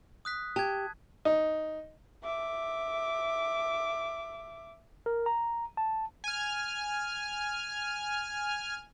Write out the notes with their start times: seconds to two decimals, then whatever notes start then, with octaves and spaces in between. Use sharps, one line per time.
0.25 D#6 F#6 B6
0.56 G4 A5 G#6
1.25 D#4
2.23 E5 D6
5.06 A#4
5.26 A#5
5.77 A5
6.24 G#5 F6